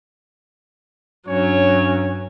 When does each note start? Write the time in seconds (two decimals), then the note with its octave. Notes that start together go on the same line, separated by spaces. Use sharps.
1.28 G2 F#3 C#4 C#5